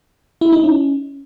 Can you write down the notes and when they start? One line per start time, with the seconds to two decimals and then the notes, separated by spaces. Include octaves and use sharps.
0.41 E4
0.53 D#4
0.64 C#4